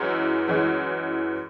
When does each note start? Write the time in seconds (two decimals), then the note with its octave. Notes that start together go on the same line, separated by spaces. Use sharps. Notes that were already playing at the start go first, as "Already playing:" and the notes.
Already playing: F#2 E3 G#3
0.48 F#2 E3 G#3